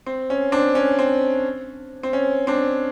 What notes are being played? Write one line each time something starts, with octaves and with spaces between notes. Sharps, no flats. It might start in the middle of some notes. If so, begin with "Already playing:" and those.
C4
C#4
C4 D4
C#4
C4
C4
C#4
C4 D4